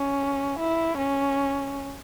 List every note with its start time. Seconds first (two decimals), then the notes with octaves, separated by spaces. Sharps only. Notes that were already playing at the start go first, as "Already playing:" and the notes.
Already playing: C#4
0.59 E4
0.98 C#4